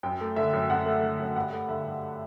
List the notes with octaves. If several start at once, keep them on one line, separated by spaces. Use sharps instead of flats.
F#2 G5
A3
D3 E5
F#2
F#2 F#5
A3
D3
F#2
G2 F#5
A3
D3 E5
G2